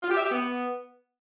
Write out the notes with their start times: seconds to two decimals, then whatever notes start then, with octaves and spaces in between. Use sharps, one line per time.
0.02 F4
0.10 G4
0.17 E5
0.24 G4
0.32 B3